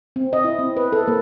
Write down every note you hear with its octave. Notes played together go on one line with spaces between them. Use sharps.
C4
D#5
E4
C4
B4
A4
A#3